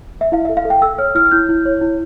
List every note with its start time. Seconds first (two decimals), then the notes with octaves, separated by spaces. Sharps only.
0.21 E5
0.32 E4 F5
0.45 A4 E5
0.57 F5
0.65 A4
0.70 G5
0.82 A4 E6
0.98 C#5 F6
1.15 E4 F6
1.26 F6
1.31 E4 G6
1.49 E4
1.66 C#5
1.81 E4